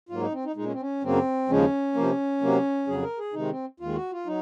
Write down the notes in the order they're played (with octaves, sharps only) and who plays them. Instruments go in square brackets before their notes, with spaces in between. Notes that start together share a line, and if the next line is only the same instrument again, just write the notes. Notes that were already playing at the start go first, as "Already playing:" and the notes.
[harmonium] G#2 F#3 A#3 F4
D#4
C4
D#4
A#2 G#3 D#4
C#4
C4
C#4
F#2 C#3 F#3 A#3 C4
D#2 C#3 F3 G#3 C#4
C3 F3 A#3
C3 F#3 A#3
F2 C#3 F#3 G#4
A#4
G#4
C3 D#3 G#3 D#4
C4
D#2 D#3 G#3 F4
F#4
F4
F#3 D#4